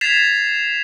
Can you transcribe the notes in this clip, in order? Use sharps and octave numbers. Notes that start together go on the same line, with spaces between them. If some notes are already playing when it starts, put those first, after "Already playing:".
G#6 A6 B6 C7 E7 F7